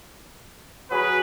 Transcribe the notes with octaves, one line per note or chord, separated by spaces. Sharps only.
F#3 G#4 B4